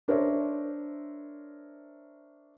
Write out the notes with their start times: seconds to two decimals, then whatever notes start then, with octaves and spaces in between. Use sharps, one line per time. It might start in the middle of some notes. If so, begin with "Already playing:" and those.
0.08 D4 A#4 C5 C#5 E5